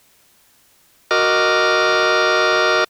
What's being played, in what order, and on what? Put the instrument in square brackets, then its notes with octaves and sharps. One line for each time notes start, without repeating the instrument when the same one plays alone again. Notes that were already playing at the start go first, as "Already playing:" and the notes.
[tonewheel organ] F#4 A#4 D#5 D6 F6